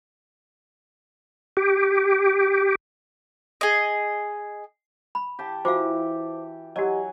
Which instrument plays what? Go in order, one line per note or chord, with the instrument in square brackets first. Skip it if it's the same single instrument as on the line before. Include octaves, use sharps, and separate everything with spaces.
[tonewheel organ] G4
[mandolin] G#4 D#5
[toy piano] B5
[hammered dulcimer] G4 A5
[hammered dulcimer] E3 [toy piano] F4 F#4 F5 [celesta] C5 D6
[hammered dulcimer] F#3 G#5 [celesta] G4 D#5